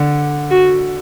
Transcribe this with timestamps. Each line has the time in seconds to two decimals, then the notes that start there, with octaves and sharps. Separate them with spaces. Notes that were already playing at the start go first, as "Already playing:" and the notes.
Already playing: D3
0.51 F#4